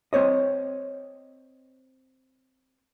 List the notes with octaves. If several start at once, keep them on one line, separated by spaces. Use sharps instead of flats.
C4 C5 C#5 D#5